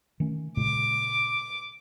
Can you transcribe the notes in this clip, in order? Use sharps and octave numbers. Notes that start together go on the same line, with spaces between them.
D#3 A3 C#4
A#2 C#3 G#3 D6